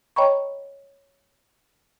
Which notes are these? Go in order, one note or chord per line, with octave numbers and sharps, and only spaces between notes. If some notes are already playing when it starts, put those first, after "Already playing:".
C#5 D#5 G5 A#5 B5 C#6